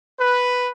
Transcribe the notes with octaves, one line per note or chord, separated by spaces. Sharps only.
B4